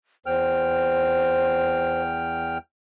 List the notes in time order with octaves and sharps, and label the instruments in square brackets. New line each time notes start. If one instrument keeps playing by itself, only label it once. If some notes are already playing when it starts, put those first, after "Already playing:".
[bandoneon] E2 G5 F6 [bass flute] C5